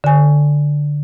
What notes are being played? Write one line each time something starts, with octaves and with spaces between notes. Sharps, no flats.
D3 G#5